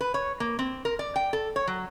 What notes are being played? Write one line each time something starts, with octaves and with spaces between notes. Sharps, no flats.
B4
C#5
A#3
C4
A#4
D5
G5
A4
C#5
F#3